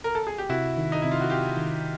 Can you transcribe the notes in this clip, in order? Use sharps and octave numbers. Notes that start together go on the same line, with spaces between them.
A#4
A4
G#4
G4
C3 E4 F#4
D#3
D#4
C3 E4
F4
F#4
C3 F4 G4
D#3